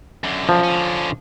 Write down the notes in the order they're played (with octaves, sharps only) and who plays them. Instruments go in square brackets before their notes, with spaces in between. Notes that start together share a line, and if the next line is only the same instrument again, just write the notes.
[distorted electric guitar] F#2 D3
[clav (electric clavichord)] F3
[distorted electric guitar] D3 C#4